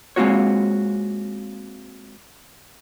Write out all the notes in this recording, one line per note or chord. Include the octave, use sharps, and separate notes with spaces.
G#3 A#3 C4 F4 F#4 C#5